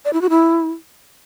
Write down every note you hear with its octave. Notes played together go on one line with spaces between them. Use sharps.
D5
E4
F#4
E4